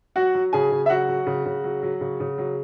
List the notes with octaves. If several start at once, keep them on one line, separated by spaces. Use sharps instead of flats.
F#3 F#4 F#5
F#3
C#3 G#4 G#5
C#3
E5
F#3 F#4 F#5
F#3
C#3
C#3
F#3
F#3
C#3
C#3
F#3